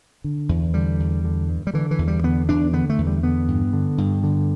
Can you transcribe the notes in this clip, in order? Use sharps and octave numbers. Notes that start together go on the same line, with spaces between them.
D3
E2
D3 G3
E2
D3
G2
G3
D3 E3
E3
E2
G3
D3 B3
E2 D4
D3 B3
A3
E2
G3
D3 B3
G2
D3
G2
D3